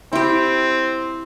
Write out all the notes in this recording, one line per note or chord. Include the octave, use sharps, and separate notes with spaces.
C4 E4 G4